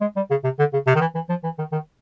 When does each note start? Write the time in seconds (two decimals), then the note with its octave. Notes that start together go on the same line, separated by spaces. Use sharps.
0.01 G#3
0.16 G3
0.30 C#3
0.44 C3
0.59 D3
0.73 C#3
0.87 C3
0.96 D#3
1.01 E3
1.15 E3
1.29 F3
1.44 E3
1.59 D#3
1.72 D#3